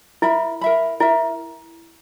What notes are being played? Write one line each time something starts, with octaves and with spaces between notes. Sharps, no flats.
E4 A#4 E5 B5
A#4 E5 B5
E4 A#4 E5